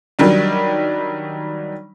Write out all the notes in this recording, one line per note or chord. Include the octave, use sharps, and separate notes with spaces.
D#3 F#3 G3 D4